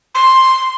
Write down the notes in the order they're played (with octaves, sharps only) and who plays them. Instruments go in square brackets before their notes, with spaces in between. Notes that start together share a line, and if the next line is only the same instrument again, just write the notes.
[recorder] C6